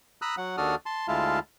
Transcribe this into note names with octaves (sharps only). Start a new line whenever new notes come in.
A#5 B5 D#6 E6 F#6
F#3 F#5
D#2 D4 F#4 A4 D#6 F6
A5 C6
D2 G#3 E4 F4 F5 A5